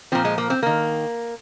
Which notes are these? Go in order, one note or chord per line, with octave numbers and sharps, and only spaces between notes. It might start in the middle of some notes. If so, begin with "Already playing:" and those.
A#2 F3 C4
G#3
A#3
C4
D#3 A#3